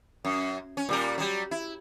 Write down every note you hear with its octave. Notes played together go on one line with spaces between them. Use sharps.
F#2
C#4
A#2 G3 A#4
F#3 G3
E4